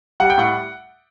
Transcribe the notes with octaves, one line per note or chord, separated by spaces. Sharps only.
G3 F#5
G5
A2 F#5